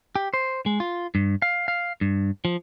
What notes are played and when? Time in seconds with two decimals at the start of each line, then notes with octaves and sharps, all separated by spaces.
0.16 G4
0.34 C5
0.66 G#3
0.80 F4
1.15 G2
1.42 F5
1.68 F5
2.01 G2
2.45 F3